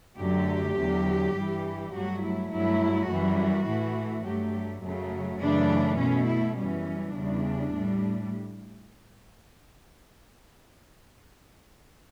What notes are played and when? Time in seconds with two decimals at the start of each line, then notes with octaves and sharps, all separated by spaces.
0.19 F#2 D3 F#3 A3 G4
0.76 E2 D3 F#3
1.35 G2 E3 G3
1.93 G2 F#3 A3 F#4
2.22 E4
2.50 G2 F#3 A3 E4
3.08 F#2 E3 G3 F#4
3.66 A2 E3 A3
4.25 G2 F#3 A3 G4
4.82 F#2 C#3 F#3 A3
5.40 F#2 C#3 E3 A3 D4
5.98 B2 A3 C#4
6.27 E4
6.56 F#2 E3 G3 C#4
7.14 E2 C#3 G3 D4
7.73 A2 G3